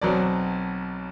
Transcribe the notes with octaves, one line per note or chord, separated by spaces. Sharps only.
B1 B2 F#3 C4 D5